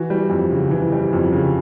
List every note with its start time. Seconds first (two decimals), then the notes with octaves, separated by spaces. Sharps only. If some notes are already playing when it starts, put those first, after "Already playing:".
Already playing: E3 F#4
0.10 G3
0.30 F2
0.51 C#3
0.71 E3
0.92 G3
1.13 F2
1.32 C#3